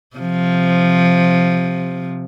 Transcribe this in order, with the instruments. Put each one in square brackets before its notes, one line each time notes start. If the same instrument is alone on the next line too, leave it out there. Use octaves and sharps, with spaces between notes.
[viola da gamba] C3 F3